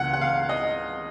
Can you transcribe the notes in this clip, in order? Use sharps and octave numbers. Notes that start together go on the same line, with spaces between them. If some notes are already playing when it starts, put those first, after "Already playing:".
Already playing: C#2 C#3 F#5
F#5
F5
D#5